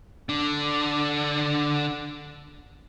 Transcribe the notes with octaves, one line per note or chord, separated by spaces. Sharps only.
D3 D4